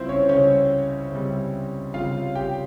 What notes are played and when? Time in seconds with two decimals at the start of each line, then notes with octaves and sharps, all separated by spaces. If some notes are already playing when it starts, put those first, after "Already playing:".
Already playing: C#2 C3 G3 C4 E4 F4 C5
0.09 C#4 C#5
0.29 C#2 C3 G3 C#4 C#5
1.12 C#2 C3 G3
1.94 C#2 C3 G3 F4 F5
2.35 G4 G5